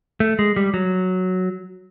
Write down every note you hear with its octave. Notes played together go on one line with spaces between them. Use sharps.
A3
G#3
G3
F#3